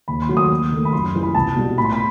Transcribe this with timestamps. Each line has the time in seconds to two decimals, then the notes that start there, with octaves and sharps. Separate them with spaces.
0.08 D#2 B5
0.22 C6
0.29 D#3 F#3 A3
0.37 D#6
0.51 D#2
0.72 D#3 A3
0.85 B5
0.93 F#2 C6
1.14 E3 G3
1.23 B5
1.35 C2 A5
1.56 B2 G3
1.78 A2 B5
1.85 C6
1.93 B5